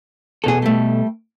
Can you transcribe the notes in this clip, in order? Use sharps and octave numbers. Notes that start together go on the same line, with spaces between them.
E2 B2 G#4 A4
G3 A3